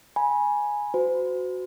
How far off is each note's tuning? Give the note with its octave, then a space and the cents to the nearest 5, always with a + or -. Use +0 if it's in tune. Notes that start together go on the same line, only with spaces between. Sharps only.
G#5 +0 B5 -30
F#4 -5 C5 -40